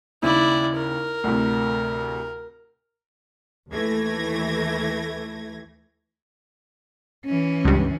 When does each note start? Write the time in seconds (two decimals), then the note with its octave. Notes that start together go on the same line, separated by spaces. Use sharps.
0.23 D#2 C#3 E4 D5
0.76 A#4
1.24 D2 A2 C3
3.70 D#2 E3 A3 G#6 A#6
7.25 E3 C#4
7.65 C#2 G2